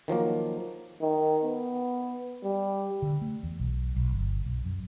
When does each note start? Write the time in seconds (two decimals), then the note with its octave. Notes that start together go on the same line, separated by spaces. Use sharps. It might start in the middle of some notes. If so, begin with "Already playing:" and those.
0.08 D#3 F3 F#3 A#3
1.01 D#3
1.43 B3
2.44 G3
3.02 D3
3.21 A3
3.43 E2
3.60 B1
3.96 B1
4.12 G1
4.46 B1
4.65 F#2